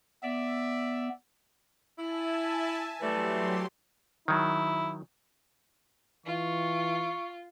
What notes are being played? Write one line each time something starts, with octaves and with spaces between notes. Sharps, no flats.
B3 D5 E5
E4 E5 G#5 A5
E3 F#3 G3 A3 G4 C6
D#3 F#3 E4
E3 F4 C#6